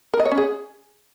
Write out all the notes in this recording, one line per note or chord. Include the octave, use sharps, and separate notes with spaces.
A#4
D#5
C#5
C#4
G#4